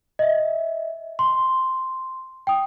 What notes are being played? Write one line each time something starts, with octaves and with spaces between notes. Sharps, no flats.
D#5 E5
C6
G5 D#6